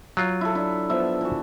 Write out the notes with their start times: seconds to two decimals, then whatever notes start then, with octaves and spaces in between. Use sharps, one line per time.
0.17 F#3 F4
0.41 E4 A4
0.55 D4 E4
0.90 F3 B3 E5
1.21 E3 F#4